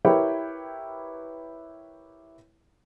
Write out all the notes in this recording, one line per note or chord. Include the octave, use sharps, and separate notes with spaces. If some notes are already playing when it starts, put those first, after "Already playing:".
E4 G4 A#4 B4 C#5 G5